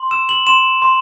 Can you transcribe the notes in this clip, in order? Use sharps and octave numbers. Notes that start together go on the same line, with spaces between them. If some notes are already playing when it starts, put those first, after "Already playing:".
Already playing: C6
E6 E7
F#7
C6 E7
C6